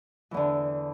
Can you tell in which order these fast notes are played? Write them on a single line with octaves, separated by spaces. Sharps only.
E3 E2 D3